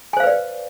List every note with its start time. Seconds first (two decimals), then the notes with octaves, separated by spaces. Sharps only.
0.13 G#5
0.17 C5
0.20 F5
0.23 B4
0.27 D5